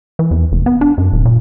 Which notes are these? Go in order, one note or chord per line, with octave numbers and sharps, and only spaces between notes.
E3
E2
F1
B3
D4
F#2
D#1
A#2